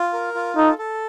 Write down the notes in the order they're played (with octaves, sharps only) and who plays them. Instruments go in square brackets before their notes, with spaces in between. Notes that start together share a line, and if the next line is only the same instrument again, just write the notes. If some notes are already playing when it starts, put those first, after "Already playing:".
Already playing: [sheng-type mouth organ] F4
A#4
F4
[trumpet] D#4 [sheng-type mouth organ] A4
[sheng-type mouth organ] A4